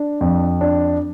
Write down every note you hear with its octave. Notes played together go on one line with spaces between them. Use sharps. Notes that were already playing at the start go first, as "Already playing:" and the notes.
Already playing: D4
F2
D4